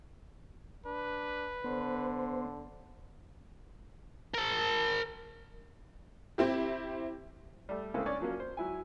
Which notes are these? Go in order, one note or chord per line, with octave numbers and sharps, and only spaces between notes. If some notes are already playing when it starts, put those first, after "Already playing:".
D4 B4
D3 B3 C5
A#4 A5
C4 E4 G4
G3 A3
C#3 G#3 A#3 C4 E4 A4
C#4 D4 C#5 D5
F3 F#3 A#3 C#4
C5
F#3 E4 G#5